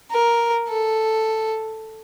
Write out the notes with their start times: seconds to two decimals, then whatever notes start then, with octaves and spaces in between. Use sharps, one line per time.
0.11 A#4
0.69 A4